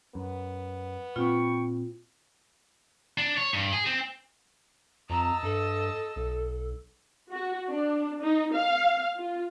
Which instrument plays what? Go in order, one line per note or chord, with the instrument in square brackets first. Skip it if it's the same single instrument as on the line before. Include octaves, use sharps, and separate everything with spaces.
[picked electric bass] F#2 [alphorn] B3
[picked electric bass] A#2 C4 [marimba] F4 [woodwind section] G5 B5 C#6
[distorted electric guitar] D4
C#5
G2
G#4
C4
[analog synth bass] F2 [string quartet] D#5 A5 E6 [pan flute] A#5
[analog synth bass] G2 [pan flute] A4
[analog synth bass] B1
[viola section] F#4
D4
D#4
F5
F4